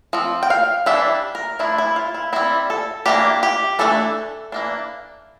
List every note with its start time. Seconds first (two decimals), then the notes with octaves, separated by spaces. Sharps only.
0.13 F3 C4
0.43 G5
0.50 F5
0.86 E3 G3 D4 E5
1.35 A#4
1.59 F3 A3 D4 E4
1.78 E4
1.96 F4
2.14 E4
2.33 G3 C4 E4
2.70 A4
3.06 E3 A#3 D4 G4
3.43 G4
3.79 E3 A3 D4 A4
4.52 E3 A#3 D4